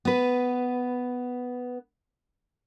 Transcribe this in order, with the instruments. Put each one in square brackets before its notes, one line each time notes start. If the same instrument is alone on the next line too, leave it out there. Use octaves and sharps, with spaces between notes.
[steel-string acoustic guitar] B3 B4